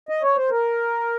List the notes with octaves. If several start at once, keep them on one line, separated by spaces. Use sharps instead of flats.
D#5
C#5
C5
A#4